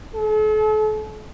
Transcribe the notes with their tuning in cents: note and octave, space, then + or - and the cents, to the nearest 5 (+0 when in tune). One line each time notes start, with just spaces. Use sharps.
A4 -40